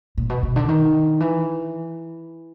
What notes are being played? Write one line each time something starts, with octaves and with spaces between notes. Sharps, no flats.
A#2
B2
B2
D3
D#3
E3